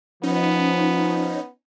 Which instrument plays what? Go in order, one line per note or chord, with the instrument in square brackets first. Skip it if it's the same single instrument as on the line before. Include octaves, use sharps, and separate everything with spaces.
[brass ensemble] F3 [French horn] B3 [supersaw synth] C#4 D#4